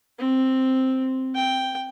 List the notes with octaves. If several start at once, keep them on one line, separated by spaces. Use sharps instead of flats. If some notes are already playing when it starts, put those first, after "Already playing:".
C4
G5